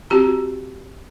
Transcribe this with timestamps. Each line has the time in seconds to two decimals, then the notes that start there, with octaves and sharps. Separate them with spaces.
0.10 C4 F#4 G4 A#5